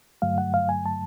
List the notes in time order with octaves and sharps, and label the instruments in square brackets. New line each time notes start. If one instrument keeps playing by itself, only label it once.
[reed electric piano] G2 D3 F#3 A3 F5
F#5
F5
G#5
A5